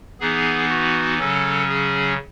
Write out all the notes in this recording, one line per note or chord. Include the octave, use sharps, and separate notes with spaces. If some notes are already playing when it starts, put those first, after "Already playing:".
E3 B3 D#4 G#4
F#4
C#3 F#3 C#4 A4
G#4